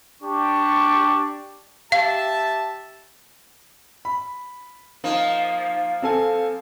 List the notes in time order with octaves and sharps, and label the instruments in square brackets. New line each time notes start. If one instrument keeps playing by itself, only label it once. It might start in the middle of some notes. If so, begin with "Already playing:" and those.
[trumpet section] D4 G4 C#6
[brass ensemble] G4 E5 A5 [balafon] F5
[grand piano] B5
[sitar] F3 A#3 [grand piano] D#4
[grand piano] C4 A4 G#5